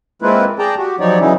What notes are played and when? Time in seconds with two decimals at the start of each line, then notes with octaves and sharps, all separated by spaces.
0.22 G#3 A#3 C4 E4 F4 B4
0.59 G#4 D5 G5 A5 A#5
0.78 F#4 G4
1.00 F3 F#3 D#4 G4 C#5 D5
1.20 C#3 E3 F#3 C#4 D#4 E4